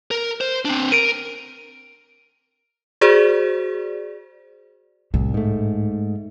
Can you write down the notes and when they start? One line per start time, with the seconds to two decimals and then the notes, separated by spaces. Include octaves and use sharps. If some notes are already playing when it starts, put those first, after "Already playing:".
0.11 A#4
0.41 C5
0.65 C4 D4
0.92 A#4 D7 D#7
3.01 F#4 G#4 C5 D5
5.14 C2 A2
5.34 G#2 A3